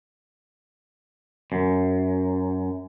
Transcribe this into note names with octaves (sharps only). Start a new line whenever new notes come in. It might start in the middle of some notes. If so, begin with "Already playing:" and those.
F#2